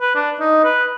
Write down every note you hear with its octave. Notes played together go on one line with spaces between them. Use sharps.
B4
D4
D#4
B4